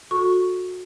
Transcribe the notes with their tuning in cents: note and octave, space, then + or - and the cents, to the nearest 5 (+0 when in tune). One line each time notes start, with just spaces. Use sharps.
F#4 -25 A4 +0 C#6 +0